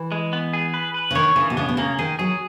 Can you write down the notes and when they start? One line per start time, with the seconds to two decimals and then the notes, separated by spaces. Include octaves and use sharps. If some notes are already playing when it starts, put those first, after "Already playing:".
Already playing: E3
0.12 G#3
0.33 B3
0.53 G#4
0.74 B4
0.94 B4
1.11 C#3
1.15 D#3 C#5
1.36 C#3 E3
1.50 B2
1.57 C#3 B3
1.69 B2
1.77 C#3 A#3
1.99 D#3 G#4
2.19 F#3 G#4